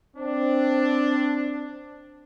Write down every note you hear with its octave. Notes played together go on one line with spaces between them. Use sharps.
C4 D4